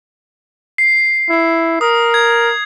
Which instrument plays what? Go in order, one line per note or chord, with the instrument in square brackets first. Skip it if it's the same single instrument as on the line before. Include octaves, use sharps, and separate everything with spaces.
[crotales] C7
[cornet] E4
[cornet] A#4 [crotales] D#6
[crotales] G#6